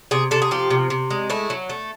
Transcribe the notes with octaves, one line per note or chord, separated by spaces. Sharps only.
C3 G#4
C3 A4
G#4
F3 G4
C3
C3
G#3
A3 E4
F#3
A3